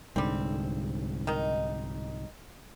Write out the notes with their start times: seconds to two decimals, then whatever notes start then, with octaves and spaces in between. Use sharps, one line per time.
0.16 C2 G#2 D3 G3 C4
1.27 D#3 D#4